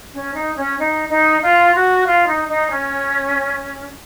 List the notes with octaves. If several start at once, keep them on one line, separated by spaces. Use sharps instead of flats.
C#4
D#4
C#4
D#4
D#4
F4
F#4
F4
D#4
D#4
C#4